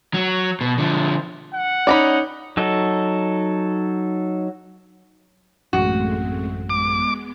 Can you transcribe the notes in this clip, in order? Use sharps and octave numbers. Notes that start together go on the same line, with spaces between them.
F#3
B2
D3 F3
F#5
C#4 D#4 D5 A#5 B5
F#3 D#4 A4
A1 F#2 G#3 A3 C4 F#4
G#3 B3 D6